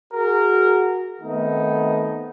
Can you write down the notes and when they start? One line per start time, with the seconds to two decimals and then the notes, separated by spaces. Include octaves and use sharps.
0.13 F#4 G#4 A#4
1.22 D#3 A3 B3 C4 D#4